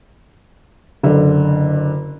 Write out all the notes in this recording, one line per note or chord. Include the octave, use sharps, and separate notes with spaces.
F#1 D3